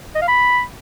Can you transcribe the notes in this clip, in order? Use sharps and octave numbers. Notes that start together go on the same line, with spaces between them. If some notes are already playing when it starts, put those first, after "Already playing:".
D#5
F5
B5